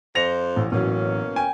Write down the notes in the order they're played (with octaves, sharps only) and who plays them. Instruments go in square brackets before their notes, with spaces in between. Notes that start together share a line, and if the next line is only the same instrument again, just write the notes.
[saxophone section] F2 C5 [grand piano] A#6 C#7 F7
[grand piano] A1
[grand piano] A1 F#3 [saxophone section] B2 A#3 C#4
[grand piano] G5 G#5